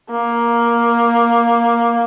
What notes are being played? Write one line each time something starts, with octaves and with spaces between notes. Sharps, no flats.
A#3